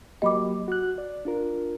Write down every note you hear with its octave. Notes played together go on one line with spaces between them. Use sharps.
F#3 A#3 G4 D#5 B5 D6
F#4 F#6
D5
D4 F4 A#4